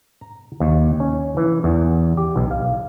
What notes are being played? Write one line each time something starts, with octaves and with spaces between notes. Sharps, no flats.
A#5
D#2
C#4
E3
E2
G4
B1
F5